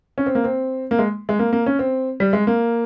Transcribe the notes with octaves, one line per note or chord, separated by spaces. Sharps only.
C#4
C4
A#3
C4
A#3
G#3
G#3
A#3
A#3
C#4
C4
G3
G#3
A#3